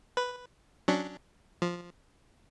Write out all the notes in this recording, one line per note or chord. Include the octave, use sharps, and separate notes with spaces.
B4
F#3 C#4 D4
F3